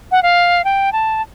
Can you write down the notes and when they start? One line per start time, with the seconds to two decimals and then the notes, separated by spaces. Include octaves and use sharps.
0.11 F#5
0.23 F5
0.64 G5
0.92 A5